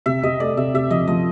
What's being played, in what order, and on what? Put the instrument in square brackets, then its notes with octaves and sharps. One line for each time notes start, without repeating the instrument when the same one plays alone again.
[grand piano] C3 [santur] E5
[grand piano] C3 [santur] D#5
[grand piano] A3 [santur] D5
[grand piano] C3 [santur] E5
[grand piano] C3 [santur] E5
[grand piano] F3 [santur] D#5
[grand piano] F3 [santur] D#5